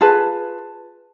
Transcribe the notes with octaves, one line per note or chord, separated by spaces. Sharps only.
F4 G#4 B4 A5